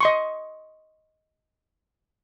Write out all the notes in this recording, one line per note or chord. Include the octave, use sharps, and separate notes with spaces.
D#5 C6 C#6